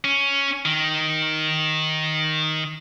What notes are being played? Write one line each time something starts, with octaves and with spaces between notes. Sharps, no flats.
C#4
D#3